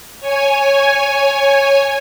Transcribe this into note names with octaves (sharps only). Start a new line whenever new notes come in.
C#5 G#5